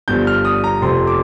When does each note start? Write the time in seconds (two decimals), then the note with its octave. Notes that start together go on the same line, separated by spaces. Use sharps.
0.08 G1 G2 F3 G6
0.27 F6
0.45 D#6
0.64 A#5
0.82 F1 F2 C3 C6
1.07 D6